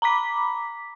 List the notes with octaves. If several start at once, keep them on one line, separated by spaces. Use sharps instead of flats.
A#5 B5 D6 B6